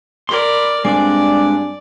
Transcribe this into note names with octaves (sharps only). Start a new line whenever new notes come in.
A#4 D5 B5 C6
G2 G#3 C4 D4 D5 G#5